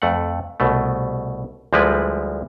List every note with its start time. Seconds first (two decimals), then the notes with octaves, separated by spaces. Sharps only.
0.02 F2 A3 F#5
0.60 C2 B2 A3
1.73 D2 F3 G3 G#3 E4 B4